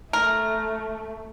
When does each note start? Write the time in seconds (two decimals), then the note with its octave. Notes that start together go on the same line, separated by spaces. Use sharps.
0.13 A3 A#4